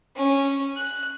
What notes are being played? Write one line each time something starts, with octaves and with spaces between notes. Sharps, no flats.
C#4
F#6